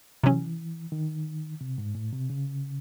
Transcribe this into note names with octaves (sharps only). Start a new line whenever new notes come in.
C3 E3 F#3 C#4
D#3
C3
G#2
A2
C3
C#3